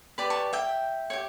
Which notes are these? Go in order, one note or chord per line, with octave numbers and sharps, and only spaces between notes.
G4 B4 D5 B5 D6
A5 C#6
E5 G5
G4 C#5